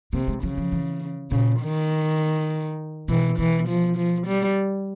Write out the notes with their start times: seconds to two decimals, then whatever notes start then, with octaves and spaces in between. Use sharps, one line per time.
0.13 C3 A#3
0.27 G#3
0.43 C#3 F#3
0.57 F3
0.72 E3
1.31 A#2 C#3
1.61 D#3
3.08 B2 E3
3.38 B2 E3
3.68 F3
3.97 F3
4.27 G3